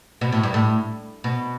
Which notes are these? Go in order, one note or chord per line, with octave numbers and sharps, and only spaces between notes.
B2
A2
G2
A2
B2